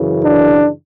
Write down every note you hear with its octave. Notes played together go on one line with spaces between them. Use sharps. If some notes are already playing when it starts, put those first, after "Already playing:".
Already playing: F#2 C#3 E3
D4